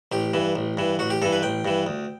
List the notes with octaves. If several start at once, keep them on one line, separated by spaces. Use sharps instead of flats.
A1 G4
G2 E3
A1
G2 E3
A1 F#4
G4
G2 E3 A4
B4
A1 G5
G2 E3
D2